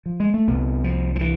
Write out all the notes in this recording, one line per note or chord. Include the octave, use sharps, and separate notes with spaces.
F3
G#3
A3
C2 C3 B3
F3
F3
E3